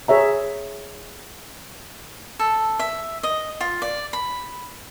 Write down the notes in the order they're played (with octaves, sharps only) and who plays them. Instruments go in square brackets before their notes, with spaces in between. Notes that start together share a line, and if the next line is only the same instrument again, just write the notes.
[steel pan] G#4 C#5 E5 A#5
[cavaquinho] A4
E5
D#5
F4
D5
B5